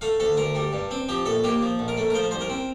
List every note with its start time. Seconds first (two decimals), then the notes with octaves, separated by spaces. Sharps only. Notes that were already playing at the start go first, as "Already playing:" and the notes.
0.01 A3 F5
0.20 D2 A4
0.37 D2 A#4
0.55 G3
0.73 G2
0.91 C4
1.09 F3 G4
1.26 A#1 A4
1.44 A#3 G4
1.62 F3
1.79 A#1
1.88 A#4
1.97 A3
2.10 A#4
2.14 F3 C5
2.31 C2 C5
2.41 A#4
2.50 C4